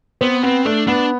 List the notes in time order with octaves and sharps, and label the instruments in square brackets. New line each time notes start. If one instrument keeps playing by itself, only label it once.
[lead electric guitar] B3 [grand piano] C4
[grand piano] B3 [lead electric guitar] C4
[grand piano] A3 [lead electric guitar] D4
[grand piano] B3 [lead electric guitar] D4